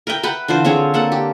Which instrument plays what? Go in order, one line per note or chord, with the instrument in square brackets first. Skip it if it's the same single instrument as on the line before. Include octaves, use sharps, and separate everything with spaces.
[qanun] A#4 B4 E5 G5
B4 F#5 G5 B5
D3 E3 F4 C5
D3 C4 G#4 C#5
A#3 A4 F#5
G4